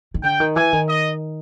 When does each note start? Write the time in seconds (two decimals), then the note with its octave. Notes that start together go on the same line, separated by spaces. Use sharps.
0.14 D#3
0.23 D3 G5
0.40 D#3
0.56 E3 G#5
0.73 D#3
0.89 D#5